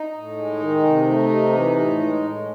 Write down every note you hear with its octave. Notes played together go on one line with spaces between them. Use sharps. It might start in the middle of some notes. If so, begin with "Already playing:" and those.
Already playing: D#4
A2
G#3
D#3
C3
A3
C3
E3
A2
G#3
A2